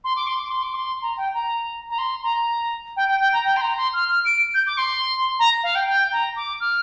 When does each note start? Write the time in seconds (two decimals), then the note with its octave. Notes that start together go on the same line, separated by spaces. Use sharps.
0.04 C6
0.16 D6
0.27 C6
0.40 D6
0.50 C6
0.63 D6
0.74 C6
1.02 A#5
1.17 G5
1.34 A#5
1.90 A#5
1.98 C6
2.23 A#5
2.96 G5
3.08 G5
3.20 G5
3.33 A#5
3.45 G5
3.56 C6
3.61 A#5
3.77 C6
3.93 F6
4.09 F6
4.25 D7
4.54 G6
4.67 D6
4.77 C6
5.39 A#5
5.63 F5
5.75 G5
5.87 G5
6.12 A#5
6.36 D6
6.60 F6